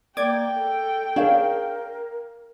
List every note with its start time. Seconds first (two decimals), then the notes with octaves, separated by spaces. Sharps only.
0.17 A#3 D5 G5 D6 G#6
0.55 A4
1.16 D4 G#4 A#4 C#5 F5